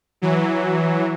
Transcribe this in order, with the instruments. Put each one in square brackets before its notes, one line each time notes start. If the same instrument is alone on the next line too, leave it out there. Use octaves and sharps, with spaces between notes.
[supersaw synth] E3 F#3